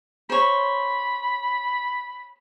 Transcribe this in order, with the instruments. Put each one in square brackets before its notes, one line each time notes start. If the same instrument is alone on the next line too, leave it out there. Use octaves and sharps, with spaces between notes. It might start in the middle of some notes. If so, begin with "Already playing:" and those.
[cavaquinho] C5 C#5 [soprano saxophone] B5